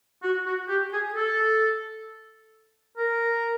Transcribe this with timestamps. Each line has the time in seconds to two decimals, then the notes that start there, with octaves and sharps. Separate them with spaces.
0.23 F#4
0.45 F#4
0.69 G4
0.92 G#4
1.14 A4
2.97 A#4